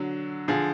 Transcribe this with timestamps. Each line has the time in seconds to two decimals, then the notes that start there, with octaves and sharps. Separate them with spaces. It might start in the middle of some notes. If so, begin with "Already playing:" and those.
Already playing: D3 F#3
0.48 D3 F3 G#4